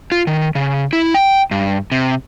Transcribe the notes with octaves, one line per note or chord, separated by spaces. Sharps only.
F4
D#3
C#3
E4
G5
G2
C3